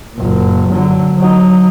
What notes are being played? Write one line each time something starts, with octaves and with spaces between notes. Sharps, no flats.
F#1 A#2
D3 F#3
F#3 D#4